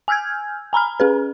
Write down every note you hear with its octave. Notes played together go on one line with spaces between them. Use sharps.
G#5 E6 F6 G6 G#6
G#5 A#5 B5 F6
C#4 G#4 B4